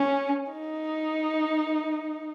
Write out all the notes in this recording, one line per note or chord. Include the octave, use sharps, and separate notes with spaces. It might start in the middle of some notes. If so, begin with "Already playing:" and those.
Already playing: C#4
D#4